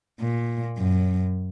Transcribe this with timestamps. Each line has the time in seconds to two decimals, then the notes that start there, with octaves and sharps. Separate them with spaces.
0.21 A#2
0.78 F#2